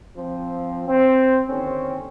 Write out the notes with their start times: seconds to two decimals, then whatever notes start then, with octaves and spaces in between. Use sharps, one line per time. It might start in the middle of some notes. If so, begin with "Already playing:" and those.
0.17 F3 C4
0.88 C4
1.49 D#2 D3 C4 C#4